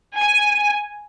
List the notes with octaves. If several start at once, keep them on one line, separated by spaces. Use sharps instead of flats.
G#5